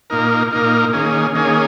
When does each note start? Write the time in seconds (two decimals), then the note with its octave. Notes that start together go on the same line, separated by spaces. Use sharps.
0.10 A#2 A#3 D#4 A#4
0.52 A#2 A#3 D#4 A#4
0.93 D#3 A#3 C#4 G#4
1.35 D#3 A#3 C#4 G#4